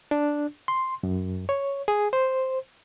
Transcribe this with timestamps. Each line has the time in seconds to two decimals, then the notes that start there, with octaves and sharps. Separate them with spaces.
0.11 D4
0.68 C6
1.03 F#2
1.49 C#5
1.88 G#4
2.13 C5